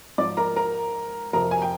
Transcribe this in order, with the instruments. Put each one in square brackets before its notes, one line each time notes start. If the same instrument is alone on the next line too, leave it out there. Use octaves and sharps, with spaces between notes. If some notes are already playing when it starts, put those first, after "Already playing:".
[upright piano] G#2 F3 D5 D6
A#4 A#5
A#4 A#5
F2 C3 F3 A#4 A#5
G#5
G5